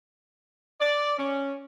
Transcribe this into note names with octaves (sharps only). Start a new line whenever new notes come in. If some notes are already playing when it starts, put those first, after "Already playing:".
D5
C#4